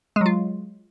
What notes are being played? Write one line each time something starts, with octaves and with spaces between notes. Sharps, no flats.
F#3 G#3 F4